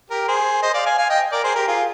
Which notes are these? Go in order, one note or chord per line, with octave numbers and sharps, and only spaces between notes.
G4 A#4
G#4 C5
C5 D#5
D5 F5
F5 G#5
F5 G#5
D#5 G5
A#4 D5
G#4 C5
G4 A#4
F4 G#4